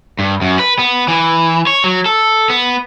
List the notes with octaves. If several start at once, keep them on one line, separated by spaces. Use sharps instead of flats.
G2
F#2
B4
B3
E3
C#5
F#3
A4
B3